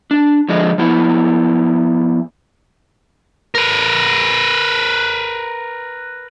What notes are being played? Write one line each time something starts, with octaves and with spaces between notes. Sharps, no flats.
D4
D3 F3 G#3 D#5
F3 B3 E4
A#4 B4